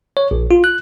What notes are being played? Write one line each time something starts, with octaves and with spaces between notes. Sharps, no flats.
C#5
A#1
F4
F#6